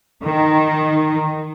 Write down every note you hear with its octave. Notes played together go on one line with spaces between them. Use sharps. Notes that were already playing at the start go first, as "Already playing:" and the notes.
D#3